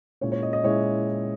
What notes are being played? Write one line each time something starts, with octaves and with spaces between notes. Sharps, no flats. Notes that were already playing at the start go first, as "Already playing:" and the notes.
A#2 G#3 C#4 E4 C#5
C#5
D#5
D#5
A#2 G#3 C#4 E4 C#5